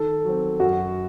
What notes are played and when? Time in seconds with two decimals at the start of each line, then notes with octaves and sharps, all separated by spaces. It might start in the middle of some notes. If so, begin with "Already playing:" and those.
Already playing: D#3 A4
0.24 F#3 C4
0.59 F#2 F#4